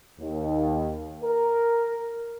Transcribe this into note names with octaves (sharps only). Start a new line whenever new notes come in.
D#2
A#4